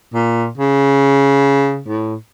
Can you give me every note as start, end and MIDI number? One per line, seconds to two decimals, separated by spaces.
0.14 0.49 46
0.58 1.81 49
1.88 2.16 45